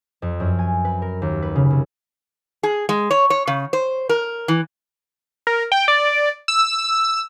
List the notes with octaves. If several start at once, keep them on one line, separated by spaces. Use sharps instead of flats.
F2
F#2
G#5
B4
A#4
D#2
B4
C#3
C2
G#4
G#3
C#5
C#5
C#3
C5
A#4
E3
A#4
G5
D5
E6